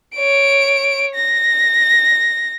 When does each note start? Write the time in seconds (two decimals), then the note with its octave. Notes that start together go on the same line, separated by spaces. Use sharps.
0.16 C#5 D7
1.15 A#6